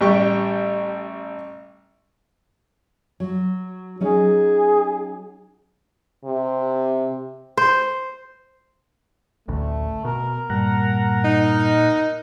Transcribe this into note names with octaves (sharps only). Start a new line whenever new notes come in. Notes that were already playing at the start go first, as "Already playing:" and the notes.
A1 G3 G4 G5 C#6
F#3
F#3 C#4 D#4 G#4
C3
C5
A1 D2 A3
B2 A#4
G2 A#2 F#5 A#5
D#4